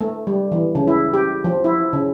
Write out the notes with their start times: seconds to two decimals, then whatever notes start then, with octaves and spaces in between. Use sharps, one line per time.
0.01 A3
0.27 G3
0.52 E3
0.75 C#3
0.87 E4
1.14 G4
1.44 F3
1.64 E4
1.93 C#3